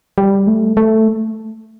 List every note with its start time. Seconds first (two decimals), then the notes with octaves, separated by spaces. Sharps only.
0.18 G3
0.47 A3
0.77 A3